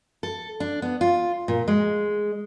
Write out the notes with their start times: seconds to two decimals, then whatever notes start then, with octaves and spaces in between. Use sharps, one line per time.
0.23 A4
0.60 D4
0.82 B3
1.01 F4
1.48 A#2
1.68 G#3